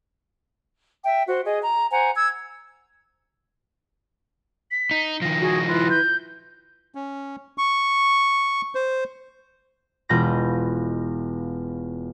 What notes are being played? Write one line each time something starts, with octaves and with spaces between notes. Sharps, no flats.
E5 G5
F#4 C5
G#4 D#5
A#5
C5 F#5 G#5 A#5
E6 G#6
B6
D#4
D#3 F3 A#6
F#4 G#4
E4 F4 B4
G6
C#4
C#6
C5
E1 F4 D#5 B5 G6 A#6